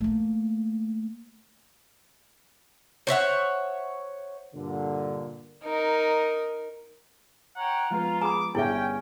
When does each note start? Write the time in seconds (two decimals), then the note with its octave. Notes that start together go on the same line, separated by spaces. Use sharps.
0.01 A3 A#3
3.07 C5 C#5 E5 F#5
4.55 G2 A#2 D3
5.64 D#4 A#4
7.57 C#5 F#5 G5 A#5
7.90 F3 G#3 B3 F4
8.21 G#4 A#5 B5 D6
8.55 G1 G2 C#4 E4 G#4 E5 G5